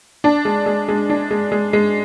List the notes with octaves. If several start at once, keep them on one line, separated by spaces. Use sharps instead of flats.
D4
G#3
G#3
G#3
D4
G#3
G#3
G#3